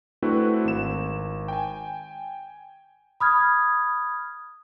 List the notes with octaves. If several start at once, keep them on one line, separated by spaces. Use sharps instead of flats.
A3 C4 D4 E4 F#4 B4
G#1 E7
G5 G#5
B5 D#6 F6 G#6